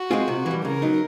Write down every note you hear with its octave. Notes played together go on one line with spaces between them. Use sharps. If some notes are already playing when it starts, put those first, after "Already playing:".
Already playing: F#4
G#3 C4 F4 G#4
C3
E3 G3
C#3 A#4
F#3 B3 D#4